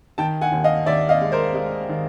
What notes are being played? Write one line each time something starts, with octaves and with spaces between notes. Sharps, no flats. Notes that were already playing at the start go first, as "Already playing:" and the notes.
D#3 G5 A5
F#5 G#5
D#2
D#5 F5
D#2 D5 E5
D#5 F5
G#3
A#4 C5
G#3
D#3